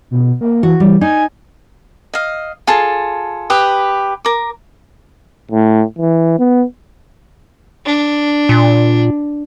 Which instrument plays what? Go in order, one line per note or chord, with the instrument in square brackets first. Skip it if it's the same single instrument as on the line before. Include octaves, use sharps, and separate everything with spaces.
[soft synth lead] B2
A#3
[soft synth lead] E3 [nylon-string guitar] F#4
[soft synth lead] E3 [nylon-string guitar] G3
[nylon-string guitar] D#4 [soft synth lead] G#5
[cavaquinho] D#5 F5
F4 G#4 A4 A5
G4 B4 D#6
A#4 D6
[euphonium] A2
E3
B3
[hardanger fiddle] D4
[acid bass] A#2